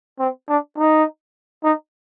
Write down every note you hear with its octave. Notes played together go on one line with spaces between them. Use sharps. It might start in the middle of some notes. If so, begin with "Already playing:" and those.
C4
D4
D#4
D#4